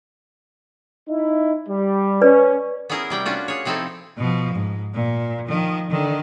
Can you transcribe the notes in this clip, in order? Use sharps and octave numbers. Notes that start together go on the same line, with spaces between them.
D#4 E4
G3
C#4 B4 D5
B3 C#4 E4 G#4 A#4
C3 G3 G5
C#4 D4 F4 F#4
G#4 C#5
C3 F3 C4 D#4 E4 A4
B2 F3
G#2
A#2
D#3 F3
D3 D#3